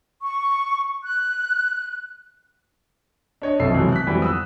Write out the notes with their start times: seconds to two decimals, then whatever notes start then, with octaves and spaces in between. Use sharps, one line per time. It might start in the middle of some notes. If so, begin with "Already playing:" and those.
0.22 C#6
1.03 F#6
3.42 D4 C#5 D#5
3.60 F1 B1 F2 A4 E5 C7
3.74 B1 C3 E3 F#3 G#3
3.92 F#6 B6
4.07 F2 G#2 E3 F#3 G3 B3
4.22 D#6 E6 F#6